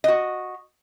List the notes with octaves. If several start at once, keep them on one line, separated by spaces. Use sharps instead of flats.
F#4 D#5